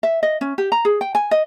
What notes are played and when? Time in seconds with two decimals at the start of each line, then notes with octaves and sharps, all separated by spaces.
0.03 E5
0.23 D#5
0.41 C#4
0.58 G4
0.72 A#5
0.85 G#4
1.01 G5
1.15 G#5
1.31 D#5